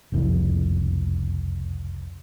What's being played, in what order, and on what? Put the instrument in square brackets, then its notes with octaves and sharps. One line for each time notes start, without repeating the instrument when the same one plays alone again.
[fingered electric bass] F#1 C2 F2